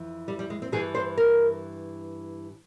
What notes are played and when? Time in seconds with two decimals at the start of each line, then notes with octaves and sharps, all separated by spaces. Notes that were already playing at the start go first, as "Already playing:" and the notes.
Already playing: F2 E3
0.28 G3
0.39 G3
0.50 G#3
0.62 C4
0.72 G2 E3 G#4
0.95 C5
1.17 A#4